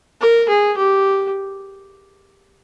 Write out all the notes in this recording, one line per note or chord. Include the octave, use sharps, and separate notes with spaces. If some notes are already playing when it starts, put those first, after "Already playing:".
A#4
G#4
G4